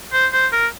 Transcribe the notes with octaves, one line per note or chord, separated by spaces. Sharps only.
C5
C5
A#4